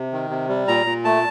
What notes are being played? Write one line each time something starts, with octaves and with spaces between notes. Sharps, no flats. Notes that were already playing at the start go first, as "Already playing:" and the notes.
Already playing: C3
D#3
C3
G3
A#2 A#5
A#2
A3 A5